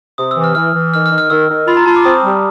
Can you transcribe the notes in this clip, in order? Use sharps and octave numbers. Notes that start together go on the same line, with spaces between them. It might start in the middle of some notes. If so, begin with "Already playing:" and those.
C3 D#6
E6
E3
F6
E3 F6
E3
D#3 F6
F6
D#3
F6
D#3 E6
D#3
F4 B5
A#5
F4 A5
D6
C4 D#6
G3